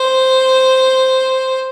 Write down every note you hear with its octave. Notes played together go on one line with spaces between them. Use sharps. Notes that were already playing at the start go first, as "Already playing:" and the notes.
Already playing: C5